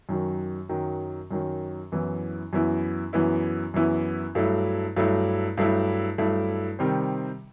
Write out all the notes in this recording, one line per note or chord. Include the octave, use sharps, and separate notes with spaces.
F#2 D#3 F#3
F#2 D#3 F#3
F#2 D#3 F#3
F#2 E3 B3 E4
F#2 E3 B3 E4
F#2 E3 B3 E4
F#2 E3 B3 E4
G2 F#3 A3 E4
G2 F#3 A3 E4
G2 F#3 A3 E4
G2 F#3 A3 E4
C3 D#3 G3 C4